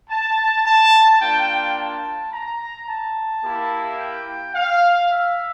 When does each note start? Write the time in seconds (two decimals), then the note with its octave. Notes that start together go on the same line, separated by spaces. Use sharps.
0.10 A5
0.64 A5
1.20 A#3 D4 F4 G5
1.76 A5
2.32 A#5
2.87 A5
3.43 A#3 E4 G4
3.98 G5
4.54 F5
5.10 E5